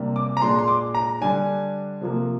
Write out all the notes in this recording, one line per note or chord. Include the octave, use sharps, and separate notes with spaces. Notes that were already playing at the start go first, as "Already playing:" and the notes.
Already playing: C3 G3 A#3 D4
D6
A#5
A#2 G#3 D4 C6
C6
D6
A#5
D3 G3 D4 G#5
C3 F3 A#3